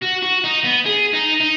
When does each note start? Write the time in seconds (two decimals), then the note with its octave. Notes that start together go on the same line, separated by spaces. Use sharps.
0.02 F#4
0.22 F#4
0.44 D#4
0.64 B3
0.86 G#4
1.13 D#4
1.40 D#4